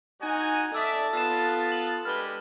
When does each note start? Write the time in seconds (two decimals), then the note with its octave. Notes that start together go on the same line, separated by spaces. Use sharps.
0.21 D#4 F#4 F#5 G#5
0.74 A4 D5 E5 A5 D#6 E6
1.13 B3 F4 E6 A6 E7
1.72 F#7
2.05 G#3 D4 G4 B4 F6 G7